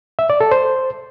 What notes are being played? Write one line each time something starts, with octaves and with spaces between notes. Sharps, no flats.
E5
D5
A4
C5